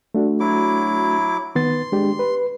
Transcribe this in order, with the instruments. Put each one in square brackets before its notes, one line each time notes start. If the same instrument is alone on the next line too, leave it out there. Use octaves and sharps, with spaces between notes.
[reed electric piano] A3 D4 F#4
[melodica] F#3 E4 D6
[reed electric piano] D#3 B3 A6 [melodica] C6
[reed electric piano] G#3 D4 G4
B4